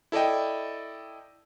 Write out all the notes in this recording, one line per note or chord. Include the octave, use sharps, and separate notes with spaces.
E4 A4 D5 D#5 G5